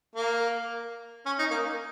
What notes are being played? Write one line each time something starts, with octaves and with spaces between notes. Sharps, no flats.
A#3
C#4
D#4
A#3